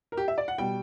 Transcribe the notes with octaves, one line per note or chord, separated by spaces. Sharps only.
A#4
G4
E5
D5
F#5
B2 G3 G5